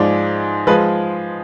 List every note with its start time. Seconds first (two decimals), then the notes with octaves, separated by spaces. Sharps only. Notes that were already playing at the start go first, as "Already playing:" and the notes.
Already playing: G#2 F3 G#3 D5
0.67 F3 G#3 B4